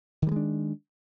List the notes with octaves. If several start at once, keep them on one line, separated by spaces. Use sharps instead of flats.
D#3 G3 G#3 D4